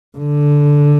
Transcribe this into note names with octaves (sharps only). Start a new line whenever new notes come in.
D3